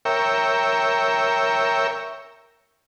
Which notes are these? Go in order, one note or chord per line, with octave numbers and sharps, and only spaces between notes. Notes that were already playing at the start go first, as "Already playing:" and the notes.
A#4 C#5 E5 G5